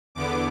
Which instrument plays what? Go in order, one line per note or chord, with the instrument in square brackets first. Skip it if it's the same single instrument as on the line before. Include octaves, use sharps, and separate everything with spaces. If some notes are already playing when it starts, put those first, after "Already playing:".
[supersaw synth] E2 D3 B3 D6